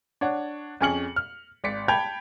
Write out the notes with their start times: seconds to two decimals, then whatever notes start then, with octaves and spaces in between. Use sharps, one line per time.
0.21 D4 C#5 F#5
0.81 F2 C#4 G#4 F6 C#7 F#7
1.16 F6
1.64 G#1 D5 B6 C#7
1.88 G5 A5 B5 G6 G#6 F7